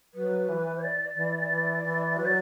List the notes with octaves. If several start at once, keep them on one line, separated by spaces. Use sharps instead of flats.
F#3 B4
E3
D5
E3
E3
E3
F#3 B4
D5